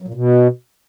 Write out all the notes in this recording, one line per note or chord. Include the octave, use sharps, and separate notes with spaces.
F#3
A#2
B2